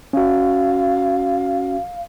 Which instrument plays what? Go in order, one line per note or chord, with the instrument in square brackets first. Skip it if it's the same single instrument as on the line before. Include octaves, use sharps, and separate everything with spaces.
[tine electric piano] C#4 F#4 [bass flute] F5